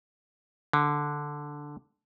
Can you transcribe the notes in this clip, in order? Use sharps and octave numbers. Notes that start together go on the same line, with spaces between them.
D3